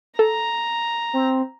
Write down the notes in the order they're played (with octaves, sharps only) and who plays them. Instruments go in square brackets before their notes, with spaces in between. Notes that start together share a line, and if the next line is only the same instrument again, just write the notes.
[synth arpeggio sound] A4 [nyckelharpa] A#5
[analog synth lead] C4